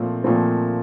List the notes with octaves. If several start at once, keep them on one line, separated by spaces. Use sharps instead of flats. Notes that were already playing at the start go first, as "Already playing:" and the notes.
Already playing: A#2 F3 A3 C4
A#2 F3 A3 C4